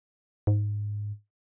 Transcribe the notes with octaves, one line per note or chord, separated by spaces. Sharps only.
G#2